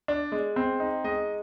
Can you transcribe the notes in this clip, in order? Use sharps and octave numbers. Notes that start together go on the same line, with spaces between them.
D4
G#3
C4
D#4
G#3 D#5